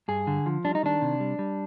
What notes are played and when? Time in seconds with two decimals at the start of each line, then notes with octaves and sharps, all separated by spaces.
0.08 G2 G#4
0.27 D3
0.46 F3
0.65 G3 D4
0.75 D#4
0.83 D#3 D4
1.02 C3
1.20 G3
1.39 G3